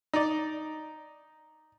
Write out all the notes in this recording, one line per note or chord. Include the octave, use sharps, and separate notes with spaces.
D#4 D5